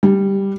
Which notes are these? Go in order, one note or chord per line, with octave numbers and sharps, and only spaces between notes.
G3